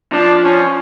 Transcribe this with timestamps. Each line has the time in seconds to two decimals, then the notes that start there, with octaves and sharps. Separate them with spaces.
0.12 F3 D4
0.44 C#4